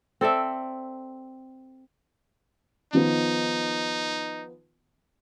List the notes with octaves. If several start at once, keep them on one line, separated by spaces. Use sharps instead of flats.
C4 A4 D5 E5
D#3 F3 B3 D#4